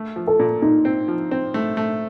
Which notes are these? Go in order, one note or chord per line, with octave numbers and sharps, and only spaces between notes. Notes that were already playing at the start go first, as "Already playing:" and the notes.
Already playing: A3
F3
A4
A#2
A#2 D#4
C4
F3
C4
A3
A3